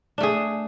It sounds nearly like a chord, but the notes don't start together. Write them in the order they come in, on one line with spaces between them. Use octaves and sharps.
D4 A3 G#4